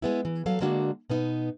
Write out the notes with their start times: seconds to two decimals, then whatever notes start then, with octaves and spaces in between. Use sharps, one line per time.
0.02 G#3 B3 E4
0.25 E3
0.46 F#3 A4 F5
0.60 D3 G#3 A#3 D4 F#4
1.10 B2 B3 D#4